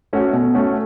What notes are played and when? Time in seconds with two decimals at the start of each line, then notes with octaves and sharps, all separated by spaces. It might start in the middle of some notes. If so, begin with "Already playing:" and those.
0.13 A3 C#4 F#4
0.33 B2
0.54 A3 C#4 F#4